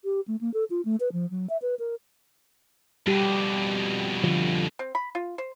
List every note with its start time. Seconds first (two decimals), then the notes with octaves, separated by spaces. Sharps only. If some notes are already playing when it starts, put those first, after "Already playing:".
0.04 G4
0.27 A3
0.41 A#3
0.54 A4
0.70 F4
0.85 A3
1.00 B4
1.13 F3
1.30 F#3
1.49 E5
1.62 B4
1.79 A#4
3.07 F2 B2 G3 G4
4.24 D3 F3
4.79 C4
4.95 B5
5.15 F4
5.38 C5